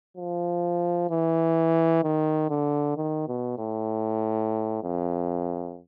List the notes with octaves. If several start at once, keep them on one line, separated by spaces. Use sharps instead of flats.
F3
E3
D#3
D3
D#3
B2
A2
F2